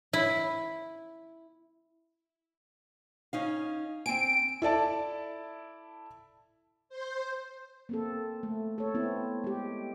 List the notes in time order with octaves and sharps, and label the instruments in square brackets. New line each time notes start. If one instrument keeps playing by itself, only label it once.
[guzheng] E4
[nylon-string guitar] C#4 D#4 F5
[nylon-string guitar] C4 G#5 [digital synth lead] D7
[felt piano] E4 A4 D5 A5
[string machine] C5
[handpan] A#3 C4 A4
A3
A4 C#5
B3 C4 E4
G#3 G4